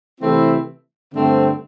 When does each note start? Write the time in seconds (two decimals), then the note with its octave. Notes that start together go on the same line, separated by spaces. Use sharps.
0.20 C3 E3 A3 C4 E4
1.14 G2 D3 A3 C4